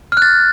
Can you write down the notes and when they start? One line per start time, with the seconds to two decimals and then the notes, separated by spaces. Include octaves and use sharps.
0.12 F6
0.17 F#6
0.22 A6